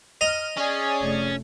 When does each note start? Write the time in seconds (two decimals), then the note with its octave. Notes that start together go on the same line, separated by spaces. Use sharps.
0.21 D#5 A#5 F6
0.57 C#4 G#4 D5
1.00 F1 A3